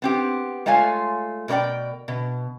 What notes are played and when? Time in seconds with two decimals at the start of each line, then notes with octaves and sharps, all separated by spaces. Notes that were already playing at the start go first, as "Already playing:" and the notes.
0.02 B3 C4 G4
0.66 G#3 A3 F4 C#5 F5 G#5
1.48 B2 A#4 C#5 D5 G5
2.08 B2